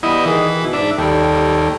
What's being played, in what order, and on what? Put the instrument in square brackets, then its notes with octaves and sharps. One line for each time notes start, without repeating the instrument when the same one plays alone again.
[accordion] E3 G3 B3 [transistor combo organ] E4 D#5
[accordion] D#3 G#4 [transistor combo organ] E3
[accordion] B2
[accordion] G#2 [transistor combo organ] D4 E5
[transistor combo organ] D#2 [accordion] G3 A4 G5